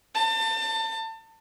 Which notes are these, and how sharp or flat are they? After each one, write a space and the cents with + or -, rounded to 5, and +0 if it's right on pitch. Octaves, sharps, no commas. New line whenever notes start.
A5 +30